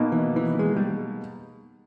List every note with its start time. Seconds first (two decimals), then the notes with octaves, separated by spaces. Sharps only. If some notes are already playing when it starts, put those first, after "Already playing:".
Already playing: B2 A#3 D#4
0.12 E3
0.36 E3
0.59 G#3
0.76 G3